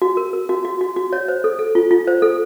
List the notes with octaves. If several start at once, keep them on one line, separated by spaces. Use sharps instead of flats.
F#4
A#4
A#4
F#4
F#4
F#4
F#4
C#5
C5
A4
A4
F4
F4
C5
A4